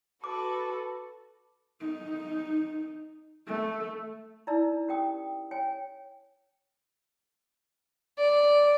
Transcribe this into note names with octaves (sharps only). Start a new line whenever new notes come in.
F#4 A4 B4 D6
D#4
A3
D#4 E4 D5 A#5 E6
C#4 G4 A#4 G5 D#6
C#5 G5 G#5
D5